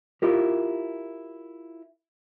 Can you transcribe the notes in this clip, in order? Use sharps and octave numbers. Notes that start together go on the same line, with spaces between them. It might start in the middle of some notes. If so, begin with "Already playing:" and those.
E4 F4 G4 A#4